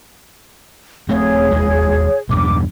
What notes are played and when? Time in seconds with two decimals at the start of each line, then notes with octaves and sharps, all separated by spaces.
1.09 D#1 A3 C4 G#4 C#5
1.51 E1 D#2 G#3
2.29 E2 G2 B2 D6